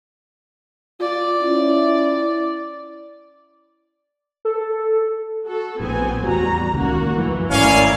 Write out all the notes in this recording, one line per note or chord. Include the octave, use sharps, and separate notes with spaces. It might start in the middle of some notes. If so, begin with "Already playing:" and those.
F4 D5
C#4 E4
A4
F#4 A4
A#1 A2 B3 C4 G#5
E2 A2 G3 F#4 A#5
C#2 D#3 A#3 C#4 F#4
G2 E3 F3 A3
G#1 A2 C#4 E4 A#4 D5 F5